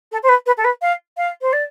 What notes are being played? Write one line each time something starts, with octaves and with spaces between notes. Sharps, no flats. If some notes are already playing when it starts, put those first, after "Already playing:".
A4
C5
B4
B4
A4
B4
F5
F5
C5
D5